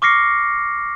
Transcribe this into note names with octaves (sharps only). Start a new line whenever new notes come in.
C#6 D6 F6 A#6 C7 C#7